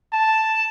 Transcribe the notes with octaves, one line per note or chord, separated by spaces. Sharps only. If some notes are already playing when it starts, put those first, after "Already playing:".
A5